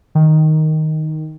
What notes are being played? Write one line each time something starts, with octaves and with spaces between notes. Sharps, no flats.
D#3